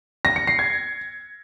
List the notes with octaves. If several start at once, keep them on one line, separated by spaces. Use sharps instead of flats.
A#6
C#7
C7
G#6